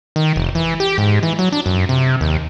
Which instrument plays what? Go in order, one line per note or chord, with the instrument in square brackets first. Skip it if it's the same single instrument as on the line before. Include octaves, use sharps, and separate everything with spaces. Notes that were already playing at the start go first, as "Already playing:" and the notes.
[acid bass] D#3
F1
E3
G4
G#2
E3
F#3
D4
F#2
C3
D#2